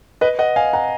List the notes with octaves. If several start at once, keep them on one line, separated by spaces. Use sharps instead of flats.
B4 D#5
D#5 F#5
F5 G#5
F#5 A#5